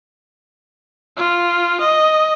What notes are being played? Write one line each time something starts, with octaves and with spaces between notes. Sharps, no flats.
F4
D#5